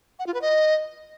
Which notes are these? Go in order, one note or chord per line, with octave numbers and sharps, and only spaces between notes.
F#5
F4
B4
D#5